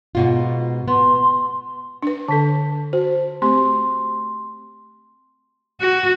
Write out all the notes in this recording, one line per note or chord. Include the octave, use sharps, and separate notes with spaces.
G#2 B2 F4
B3 C6
D4 B4
D3 A4 A5 B6
F#4 C5
A3 C4 G4 C6
F#4